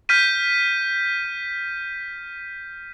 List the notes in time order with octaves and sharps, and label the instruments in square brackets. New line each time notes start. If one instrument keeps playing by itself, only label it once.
[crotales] F6 G6 B6 D#7